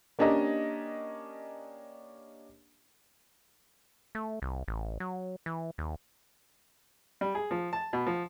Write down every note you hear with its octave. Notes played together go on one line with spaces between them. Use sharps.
A#3 C#4 D4 G4 D#5 A#5
A3
C2
A1
F#3
E3
D#2
G3
G#4
F3
A5
B2
F3